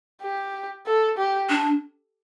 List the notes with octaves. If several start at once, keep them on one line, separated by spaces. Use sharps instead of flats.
G4
A4
G4
D4